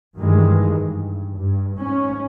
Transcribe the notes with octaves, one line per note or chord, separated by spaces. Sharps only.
G2 D#3 E3 G#3
G2
G2
G#2 C#4